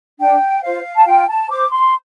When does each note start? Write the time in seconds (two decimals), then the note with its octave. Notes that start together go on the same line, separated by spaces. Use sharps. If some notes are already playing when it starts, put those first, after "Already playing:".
0.20 D4 G5
0.63 F4 C5 F5
0.96 A5
1.06 F4 G5
1.28 A5
1.49 C5 D6
1.71 C6